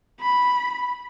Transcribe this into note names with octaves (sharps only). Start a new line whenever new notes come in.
B5